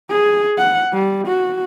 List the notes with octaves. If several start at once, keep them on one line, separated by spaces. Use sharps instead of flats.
G#4
F#5
G3
F#4